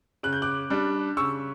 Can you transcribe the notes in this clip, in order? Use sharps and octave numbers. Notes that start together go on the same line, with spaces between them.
C#3 F#6
G6
D6 F#6
G3 D4
C#3 C#6 E6